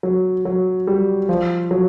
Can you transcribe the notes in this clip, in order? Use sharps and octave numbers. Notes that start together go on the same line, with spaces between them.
F#3
F#3
G3
F3
F#3